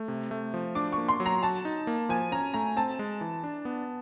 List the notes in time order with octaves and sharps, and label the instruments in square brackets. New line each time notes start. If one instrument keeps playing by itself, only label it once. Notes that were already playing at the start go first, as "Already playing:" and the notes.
Already playing: [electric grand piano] A3
C3
A3
F3
[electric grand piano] D4 [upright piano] D6
[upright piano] C#6
[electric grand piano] A#3
[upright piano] C6
[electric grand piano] F#3
[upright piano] A#5
[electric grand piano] F#4 [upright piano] A5
[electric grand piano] D#4
A#3
[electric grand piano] F3 [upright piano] G#5
[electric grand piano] C#4 [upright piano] A#5
[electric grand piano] A3 [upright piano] A#5
[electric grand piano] C4 [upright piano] A5
[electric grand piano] G#3
E3
D4
B3